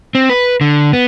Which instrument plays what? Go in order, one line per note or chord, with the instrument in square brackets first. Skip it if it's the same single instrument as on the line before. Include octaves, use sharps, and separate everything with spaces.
[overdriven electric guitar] C4
B4
D3
B3